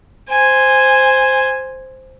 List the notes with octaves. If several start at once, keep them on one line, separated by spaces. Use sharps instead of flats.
C5 G#5